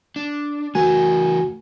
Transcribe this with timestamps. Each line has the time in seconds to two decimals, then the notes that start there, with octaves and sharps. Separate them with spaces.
0.16 D4
0.75 E3 A3 F#4 A#4 G#5